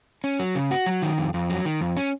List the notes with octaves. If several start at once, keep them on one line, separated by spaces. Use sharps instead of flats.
C#4
F#3
C#3
F#4
F#3
D#3
F2
F2
F#3
D#3
F2
C#4